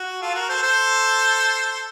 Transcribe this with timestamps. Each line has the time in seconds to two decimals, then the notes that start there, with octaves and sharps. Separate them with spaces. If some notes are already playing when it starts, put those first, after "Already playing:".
Already playing: F#4
0.22 F4 A4
0.35 F#4 A#4
0.49 A4 C5
0.62 A4 C5